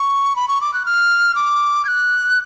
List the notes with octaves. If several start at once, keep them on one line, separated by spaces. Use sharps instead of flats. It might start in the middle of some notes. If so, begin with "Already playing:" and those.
Already playing: C#6
B5
C#6
D6
F#6
F6
D6
G#6
F#6